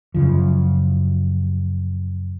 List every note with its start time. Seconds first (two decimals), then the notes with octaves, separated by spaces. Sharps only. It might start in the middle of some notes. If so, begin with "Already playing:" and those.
0.14 F#2 C#3 F3